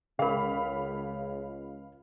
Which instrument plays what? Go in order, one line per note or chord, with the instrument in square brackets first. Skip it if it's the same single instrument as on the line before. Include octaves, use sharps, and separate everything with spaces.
[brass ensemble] C#2 [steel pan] C#3 [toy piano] G#4 A#4 [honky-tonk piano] F5 B5